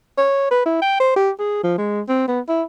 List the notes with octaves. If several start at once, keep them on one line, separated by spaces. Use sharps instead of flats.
C#5
B4
E4
G5
C5
G4
G#4
F3
G#3
C4
B3
E4